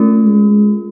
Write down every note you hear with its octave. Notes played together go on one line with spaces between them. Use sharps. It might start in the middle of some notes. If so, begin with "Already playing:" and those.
Already playing: A3 C#4 F4
G#3